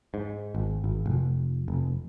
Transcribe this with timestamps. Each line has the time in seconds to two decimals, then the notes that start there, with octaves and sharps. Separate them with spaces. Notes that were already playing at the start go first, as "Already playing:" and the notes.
0.14 G#2
0.55 G#1
0.84 G#1
1.06 F1
1.68 F1